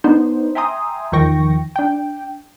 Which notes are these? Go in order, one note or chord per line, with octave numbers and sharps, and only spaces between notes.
B3 D4 D#4 C5
E5 G5 G#5 A#5 C6 D#6
E2 D#3 F3 G5 C#6 A#6
D4 G5